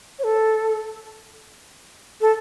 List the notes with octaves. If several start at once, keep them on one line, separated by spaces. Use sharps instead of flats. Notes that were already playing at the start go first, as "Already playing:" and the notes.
C#5
A4
A4